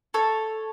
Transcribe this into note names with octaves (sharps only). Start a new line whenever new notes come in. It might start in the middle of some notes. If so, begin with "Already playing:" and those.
A4 C#5